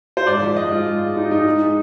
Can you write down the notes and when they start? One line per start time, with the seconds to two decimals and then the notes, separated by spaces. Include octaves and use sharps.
0.17 C5
0.27 G#2 D5
0.41 F3
0.56 G#2 D#5
0.71 G#2 F4
0.87 G#2
1.01 G#3
1.16 G#3 D#4
1.31 G#2 D#4
1.46 G#3
1.61 G#3